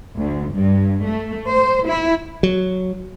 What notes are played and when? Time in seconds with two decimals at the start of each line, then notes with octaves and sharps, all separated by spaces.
0.16 D2
0.53 G2
1.05 A3
1.47 C5
1.85 E4
2.43 F#3